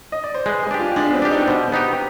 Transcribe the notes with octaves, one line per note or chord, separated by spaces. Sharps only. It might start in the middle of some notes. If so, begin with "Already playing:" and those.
D#5
D5
C5
G#3 B4
G#4
D4 G4
F4
G#3 D4
B3
C4
D4 G4
D#4
B2 C5
B3 D#4 G4